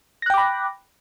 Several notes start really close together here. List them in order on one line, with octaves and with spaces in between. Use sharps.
A#6 F#6 G5 D6 B5